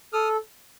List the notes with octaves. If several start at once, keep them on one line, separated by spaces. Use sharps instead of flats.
A4 D#6 F6